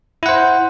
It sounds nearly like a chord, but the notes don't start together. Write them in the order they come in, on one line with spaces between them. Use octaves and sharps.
E4 F#5 C5